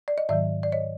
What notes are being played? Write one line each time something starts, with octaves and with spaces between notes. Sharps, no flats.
D5
D#5
G#2 D#3 F#3 D5 E5
D5
C#5 D#5